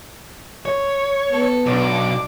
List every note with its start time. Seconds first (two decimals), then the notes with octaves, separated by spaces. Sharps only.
0.65 C#5
1.31 B3 A4
1.66 B1 D4 D6